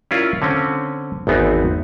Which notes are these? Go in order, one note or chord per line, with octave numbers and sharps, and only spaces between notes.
C#4 E4 F4 A#4 D5
D3 C4 C#4
G#1 E2 B3 C4 D#4